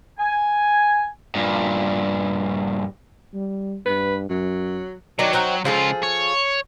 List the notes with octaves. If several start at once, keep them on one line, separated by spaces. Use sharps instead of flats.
G#5
G2 A#2
G3
G2 B4
F#2 F#3
D#3 F#3 D4
C4 D#4 F#4
C#2 F3 F4 G#4 A4
C#5